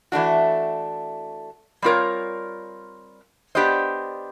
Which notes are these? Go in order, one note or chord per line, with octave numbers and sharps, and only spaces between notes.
E3 A3 D4 F#4
G3 C4 F4 A#4 C#5
B3 D4 G4 C5 D#5